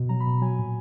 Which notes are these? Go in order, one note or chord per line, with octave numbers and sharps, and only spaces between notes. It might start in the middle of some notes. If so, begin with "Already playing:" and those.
Already playing: B2
F#3 A#5
B5
B2
F#3 G#5
A#2